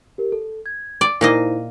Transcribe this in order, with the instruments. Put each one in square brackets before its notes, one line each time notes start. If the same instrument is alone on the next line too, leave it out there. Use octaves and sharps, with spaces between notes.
[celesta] G4 A#4
A4
G#6
[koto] D5
[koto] A#2 A#3 D#5 [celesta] D#4 E4 C5